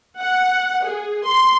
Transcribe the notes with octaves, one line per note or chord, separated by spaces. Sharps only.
F#5
G#4
C6